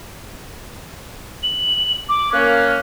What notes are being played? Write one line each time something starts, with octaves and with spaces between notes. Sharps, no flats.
F#7
D6
A#3 C#4 F#6